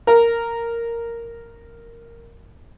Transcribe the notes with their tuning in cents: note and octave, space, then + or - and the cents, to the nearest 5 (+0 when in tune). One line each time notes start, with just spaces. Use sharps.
A#4 -5